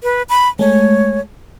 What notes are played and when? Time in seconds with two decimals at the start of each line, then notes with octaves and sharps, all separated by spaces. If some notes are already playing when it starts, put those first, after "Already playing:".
0.03 B4
0.29 B5
0.59 G#3 A3 C#5